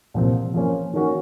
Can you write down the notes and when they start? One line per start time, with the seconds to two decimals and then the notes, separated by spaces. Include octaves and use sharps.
0.14 C2 A#2 F3 C4
0.54 F3 A#3 C#4
0.94 D#3 A#3 C#4 F#4